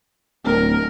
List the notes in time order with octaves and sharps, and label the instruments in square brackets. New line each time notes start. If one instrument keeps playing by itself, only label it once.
[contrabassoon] D1 [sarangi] A#4